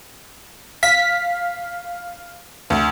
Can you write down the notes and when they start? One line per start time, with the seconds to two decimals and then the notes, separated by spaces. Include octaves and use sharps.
0.83 F5 B6
2.70 D2